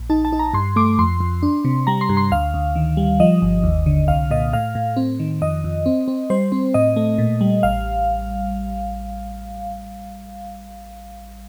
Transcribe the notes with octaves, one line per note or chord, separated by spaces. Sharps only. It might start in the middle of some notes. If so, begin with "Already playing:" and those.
Already playing: A#1
D#4 A5
A5
D#4
A#5
G2 C6
A3 D6
F2 C6
F2
D4
C3
G3 A#5
C6
G2
C6
D2 F5
D2
D#3
G3
F3 D#5
G1
D#2
D3
C2 F5
A#2 D#5
A2 F5
A2
C4
D#3
F2 D#5
F2
C4
C4
G3 C5
C4
A2 D#5
A3
A#2
G3
A1 F5